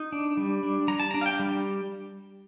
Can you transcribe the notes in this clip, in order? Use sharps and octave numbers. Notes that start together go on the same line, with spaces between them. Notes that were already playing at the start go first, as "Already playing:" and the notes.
Already playing: D#4
D4
G3
D4
G3 A#5
A5
D4 A#5
F5
G5
G3